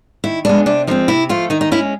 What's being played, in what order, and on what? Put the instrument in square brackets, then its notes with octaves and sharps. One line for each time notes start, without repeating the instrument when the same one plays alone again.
[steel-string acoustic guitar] D#3 E4
G#3 B3 D4
C3 D4
F3 G#3 C4 D#4
C3 E4
F3 A3 F4
D#3 D#4
D#4
G#3 C#4 E4